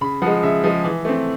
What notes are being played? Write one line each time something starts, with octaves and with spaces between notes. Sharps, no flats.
C#3 B5
F3 G#3 F#5
C#3 E5
F3 G#3
E3
A3 C4